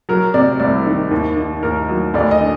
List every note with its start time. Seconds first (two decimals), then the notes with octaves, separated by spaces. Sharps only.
0.09 F#3 A#4
0.34 C3 D5
0.60 C2 D5
0.87 D#3
1.11 D#2
1.37 D#3
1.63 D#2 A#4
1.89 F#3
2.14 D2 D5
2.31 D#5
2.41 D3